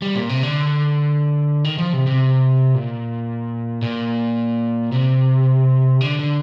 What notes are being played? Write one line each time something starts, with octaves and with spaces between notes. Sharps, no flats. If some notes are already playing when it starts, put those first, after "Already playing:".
G3
A#2
C3
D3
D#3
F3
C3
C3
A#2
A#2
C3
D3
D3